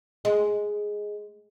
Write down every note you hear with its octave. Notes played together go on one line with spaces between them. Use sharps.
G#3